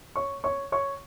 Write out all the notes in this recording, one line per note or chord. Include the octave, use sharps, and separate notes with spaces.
C#5 C#6
C#5 C#6
C#5 C#6